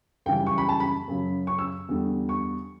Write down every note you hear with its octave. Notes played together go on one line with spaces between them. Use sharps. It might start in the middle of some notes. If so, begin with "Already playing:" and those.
F#2 C#3 E3 G3 G5
C#6
B5
A5
B5
F#2 C#3 F#3
C#6
E6
E2 D3 G3
C#6